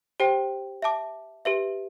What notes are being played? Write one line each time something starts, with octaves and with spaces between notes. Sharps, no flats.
G4 C5 G5
E5 A5 D6
G4 B4 E5